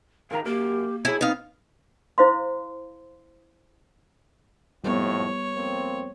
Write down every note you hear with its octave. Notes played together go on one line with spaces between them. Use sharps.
G#2 D#3 A#4 F5 A#5
F#2 A#3 G4 A#4
B1 E4 G#4 C#5
B3 C4 D#4 F5
E4 C5 F5 C6
G#1 F2 A2 G3 B3 C#5
F2 A#3 C4